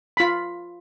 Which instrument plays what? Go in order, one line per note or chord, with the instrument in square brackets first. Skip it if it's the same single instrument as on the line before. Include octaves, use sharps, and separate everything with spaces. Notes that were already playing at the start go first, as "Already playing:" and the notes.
[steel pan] F4 B5